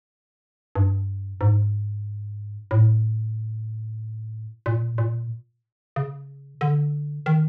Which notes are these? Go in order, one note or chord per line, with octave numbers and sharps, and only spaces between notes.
G2
G#2
A2
A#2
A#2
C#3
D3
D#3